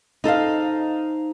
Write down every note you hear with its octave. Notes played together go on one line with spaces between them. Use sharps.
D#4 A4 C5 F5